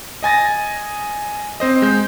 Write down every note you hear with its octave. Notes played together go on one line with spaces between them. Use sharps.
D#5 G#5 A6 A#6
C4 C5 D#5
G#3 G6